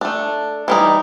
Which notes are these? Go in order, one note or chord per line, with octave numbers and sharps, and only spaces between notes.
A3 D4
E3 G3 D#4